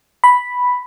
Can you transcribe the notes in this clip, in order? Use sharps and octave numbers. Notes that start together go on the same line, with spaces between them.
B5